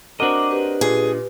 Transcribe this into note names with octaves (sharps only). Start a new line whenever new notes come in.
C4 D4 F#4 A#4 D#5 D6
G4 B4
A#2 G#4